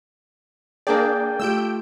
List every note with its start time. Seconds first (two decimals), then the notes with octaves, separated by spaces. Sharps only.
0.87 A#3 D4 G#4 D5 G5
1.40 A3 F4 G4 E6 G6 D7